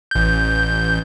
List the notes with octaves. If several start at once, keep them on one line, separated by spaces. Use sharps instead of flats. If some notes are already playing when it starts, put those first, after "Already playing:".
A1 G6